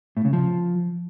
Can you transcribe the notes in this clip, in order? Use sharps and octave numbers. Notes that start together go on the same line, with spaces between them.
A2
C#3
F3